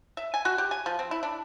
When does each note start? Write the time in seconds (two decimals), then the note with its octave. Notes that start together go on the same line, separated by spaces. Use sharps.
0.17 E5
0.34 G#5
0.45 F#4
0.58 G4
0.71 G#5
0.86 F3
0.99 C4
1.11 E4
1.23 D4